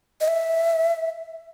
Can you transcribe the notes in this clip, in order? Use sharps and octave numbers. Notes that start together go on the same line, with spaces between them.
D#5
E5